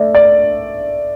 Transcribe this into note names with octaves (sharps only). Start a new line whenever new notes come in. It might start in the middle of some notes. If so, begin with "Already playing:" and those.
Already playing: A3 D5 E5
D5